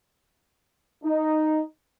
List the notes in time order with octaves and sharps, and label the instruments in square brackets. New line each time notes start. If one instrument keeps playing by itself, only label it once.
[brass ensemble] D#4